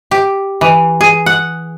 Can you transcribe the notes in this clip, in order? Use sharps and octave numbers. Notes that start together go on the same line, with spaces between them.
G4
E3
G#4
F#5